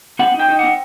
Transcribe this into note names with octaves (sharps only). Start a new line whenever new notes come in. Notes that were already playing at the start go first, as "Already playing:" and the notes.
C4 F#5
D#4
G5
D#4
C4 F#5